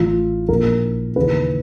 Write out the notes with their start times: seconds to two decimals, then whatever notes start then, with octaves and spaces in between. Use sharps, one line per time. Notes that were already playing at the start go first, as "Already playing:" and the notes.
Already playing: A1 A2 E3 F4
0.49 A#1 A#2 A#4
1.16 D#2 C#3 E3 B4